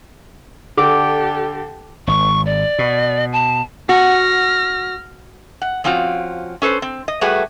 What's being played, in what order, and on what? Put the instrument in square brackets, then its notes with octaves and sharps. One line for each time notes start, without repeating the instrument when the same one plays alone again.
[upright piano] D3 [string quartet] G4 A4 [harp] D6
[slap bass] G#1 [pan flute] C#6
[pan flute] D5
[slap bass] B2
[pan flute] A5
[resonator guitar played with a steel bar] F#4 [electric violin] F6 A#6
[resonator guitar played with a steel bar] F#5
F3 C4 C#4 F4 F#4
C#4 A4 B4 C5
C4
D#5
G3 A3 F#4 G#4 B4